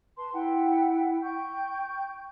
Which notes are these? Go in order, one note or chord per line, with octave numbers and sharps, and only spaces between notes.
B4 A5 C6
E4 F#5 G5
G5 C#6 G6